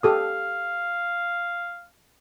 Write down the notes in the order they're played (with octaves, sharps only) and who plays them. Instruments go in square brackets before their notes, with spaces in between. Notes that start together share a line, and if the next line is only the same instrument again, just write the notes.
[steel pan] G4 A4 D#6 [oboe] F5